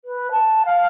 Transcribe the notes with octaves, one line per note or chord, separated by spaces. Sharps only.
B4
A5
F5